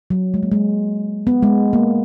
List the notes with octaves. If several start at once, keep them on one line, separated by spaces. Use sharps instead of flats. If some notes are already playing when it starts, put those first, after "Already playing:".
F#3
G#3
A#3
G#3
B3
G#3
A#3